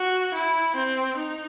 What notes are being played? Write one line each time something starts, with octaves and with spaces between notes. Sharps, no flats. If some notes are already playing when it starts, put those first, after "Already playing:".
Already playing: F#4
E4
C4
D#4